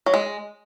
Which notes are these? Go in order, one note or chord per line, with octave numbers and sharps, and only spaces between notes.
F#3
G#3